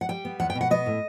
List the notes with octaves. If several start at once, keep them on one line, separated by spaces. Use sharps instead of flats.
F#5
G3 G5
B3
E2 F#5
G5
B2
F#5
B3 D#5
A2